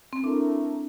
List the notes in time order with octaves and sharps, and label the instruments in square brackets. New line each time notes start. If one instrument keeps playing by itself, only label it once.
[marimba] C4
[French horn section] A3 E4 A#4 [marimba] D4